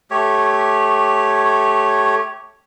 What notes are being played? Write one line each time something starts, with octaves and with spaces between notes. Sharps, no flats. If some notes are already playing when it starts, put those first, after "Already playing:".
A3 G4 C#5